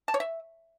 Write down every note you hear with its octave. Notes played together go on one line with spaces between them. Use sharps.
A5
C#5
E5